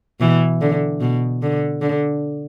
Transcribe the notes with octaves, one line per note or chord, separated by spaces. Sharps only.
B2 E3
D3
B2
D3
D3